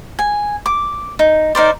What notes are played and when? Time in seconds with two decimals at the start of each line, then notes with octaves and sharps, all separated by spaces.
0.19 G#5
0.66 D6
1.19 D#4
1.55 D#4 A#4 C5 D5